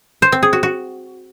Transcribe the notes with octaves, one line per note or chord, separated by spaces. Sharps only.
C5
C4
G#4
F#4
F#4